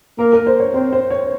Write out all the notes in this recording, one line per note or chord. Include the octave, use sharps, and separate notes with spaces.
A#3 A#4
A#4
C5
C#5
C4 C5
C5
C#5